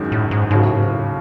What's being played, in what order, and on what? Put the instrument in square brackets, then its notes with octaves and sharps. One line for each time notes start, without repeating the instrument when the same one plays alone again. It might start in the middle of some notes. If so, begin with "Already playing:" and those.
Already playing: [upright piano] G#1 F#2 D#3 G#3 C#4
[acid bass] A2
G#2
[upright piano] D#2 C#3 F#3 [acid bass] G#2
[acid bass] A2
G#2
A2